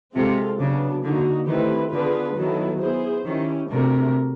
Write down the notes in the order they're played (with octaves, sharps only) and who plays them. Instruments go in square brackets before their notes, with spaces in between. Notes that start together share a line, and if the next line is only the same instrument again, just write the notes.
[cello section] C3 [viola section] G#3 C4 F4 A4
[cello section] C#3 [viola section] F#3 B3 D4
[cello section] D3 [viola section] A#3 D#4 F#4
[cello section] D#3 [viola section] A3 C4 E4 G4 B4
[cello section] D3 [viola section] B3 D4 F4 G#4 B4
[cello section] D#3 [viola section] F#3 B3 E4 A4
[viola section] B3 E4 G#4 C5
[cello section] D#3 [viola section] C#4 E4 G4
[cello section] C3 [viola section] A3 D4 F#4 A#4